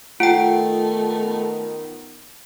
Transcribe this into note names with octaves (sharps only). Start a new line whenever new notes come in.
D#3 A3 B3 F4 F#5 G5